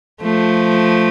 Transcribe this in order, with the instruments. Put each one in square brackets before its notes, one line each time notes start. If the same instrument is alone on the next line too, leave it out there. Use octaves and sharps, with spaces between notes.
[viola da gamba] F3 A3